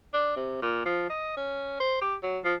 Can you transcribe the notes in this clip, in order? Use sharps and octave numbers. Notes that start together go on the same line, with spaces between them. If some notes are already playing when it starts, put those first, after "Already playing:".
D4
C3
A#2
F3
D#5
C#4
C5
G4
F#3
F3